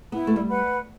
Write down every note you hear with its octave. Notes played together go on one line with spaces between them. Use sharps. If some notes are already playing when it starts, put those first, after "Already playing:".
B3 E4
A3
G3
B4 F#5 B5